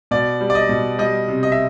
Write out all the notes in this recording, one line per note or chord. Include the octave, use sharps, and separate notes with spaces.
B2 D5
G3
D5
D#5
B2
G3 D#5
C3
D#5
E5